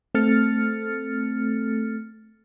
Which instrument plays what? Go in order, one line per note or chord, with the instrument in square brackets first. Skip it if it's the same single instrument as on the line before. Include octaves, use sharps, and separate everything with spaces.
[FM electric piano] A3 C4 A4 F6 A6 C#7